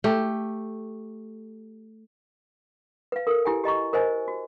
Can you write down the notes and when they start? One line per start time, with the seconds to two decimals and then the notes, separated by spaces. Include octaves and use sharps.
0.04 A3 G4
3.12 B4 F5
3.27 A4 A#4
3.45 E4 G4 G5 G#5
3.64 G4 D#5 A#5 C#6
3.93 A#4 C5 D#5 G#5
4.28 F#4